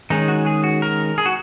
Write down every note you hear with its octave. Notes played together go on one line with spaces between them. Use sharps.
D#3 G#3 C#4 D#4
F#4
G#4
F#4
A#4
G#4
F#4